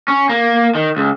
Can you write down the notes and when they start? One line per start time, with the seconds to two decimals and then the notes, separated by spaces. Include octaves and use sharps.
0.08 C#4
0.29 A#3
0.75 D#3
0.97 C#2